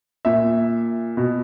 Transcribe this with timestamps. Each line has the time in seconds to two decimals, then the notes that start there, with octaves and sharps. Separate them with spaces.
0.25 A#2 E5
1.17 B2